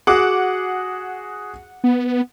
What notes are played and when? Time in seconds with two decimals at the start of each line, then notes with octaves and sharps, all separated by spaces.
0.07 F#4 G#4 F#5 D6
1.84 B3